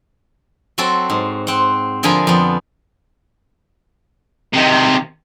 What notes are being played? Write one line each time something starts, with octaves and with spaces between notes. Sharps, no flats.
F#3 C4 F#4 A4
G#2
C4 F#5
D3 F3 G#4 A#4 G#5 B5
F2 B3
C3 D#3